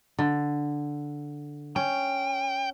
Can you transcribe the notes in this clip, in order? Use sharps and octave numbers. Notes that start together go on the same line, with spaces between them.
D3
C#4 G5